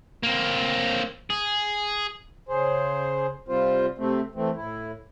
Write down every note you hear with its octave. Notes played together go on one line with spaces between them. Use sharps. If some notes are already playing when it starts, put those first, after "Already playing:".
A#3 C4
G#4
C#3 G#4 C5
C3 G3 C4 F4 C5
C3 A3 C4
E3 A3 C4
A2 E4